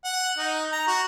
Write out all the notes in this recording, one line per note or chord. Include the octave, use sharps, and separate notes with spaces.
F#5
D#4
A#5
F#4